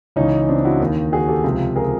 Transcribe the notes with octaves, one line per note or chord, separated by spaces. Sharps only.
C#2 C#3 E3 C#4 D#4
C4 D4
E4 F#4
D#2 D#3
F#4 G#4
G4 A4
C#2 C3 F3
G#4 A#4